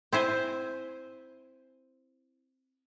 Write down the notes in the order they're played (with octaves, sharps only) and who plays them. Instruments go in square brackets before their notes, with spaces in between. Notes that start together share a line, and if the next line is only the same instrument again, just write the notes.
[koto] C4 E4 C5 G#5